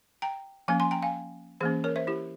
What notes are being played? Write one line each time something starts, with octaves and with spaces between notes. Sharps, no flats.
G5 A#5
F3 A#3 C#4 F5 G#5
G#5 C6
G5 A#5
F5 G#5
E3 A#3 C#4 G#4 C5
A#4 C#5
C5 E5
E4 G4